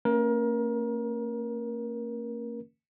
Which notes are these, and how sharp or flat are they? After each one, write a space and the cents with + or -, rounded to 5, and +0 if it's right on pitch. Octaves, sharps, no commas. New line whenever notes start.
A#3 -40 C#4 -20 A#4 +25